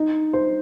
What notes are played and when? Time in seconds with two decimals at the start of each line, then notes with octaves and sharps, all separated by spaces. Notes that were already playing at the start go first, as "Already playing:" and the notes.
Already playing: D#4
0.33 C5